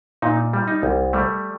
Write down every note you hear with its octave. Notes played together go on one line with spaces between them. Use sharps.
A#2 D#4
G3
D#4
C2
G3 A3